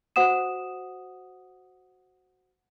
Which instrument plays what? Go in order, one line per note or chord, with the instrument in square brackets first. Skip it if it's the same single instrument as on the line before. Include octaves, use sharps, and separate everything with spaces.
[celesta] F#4 C5 F#5 D#6 E7